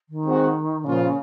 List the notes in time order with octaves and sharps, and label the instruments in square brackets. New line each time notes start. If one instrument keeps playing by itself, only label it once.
[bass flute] D#3
[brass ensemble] G#3 C4 F#4
[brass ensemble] A#2 F3 A#3 F4 [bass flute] C#3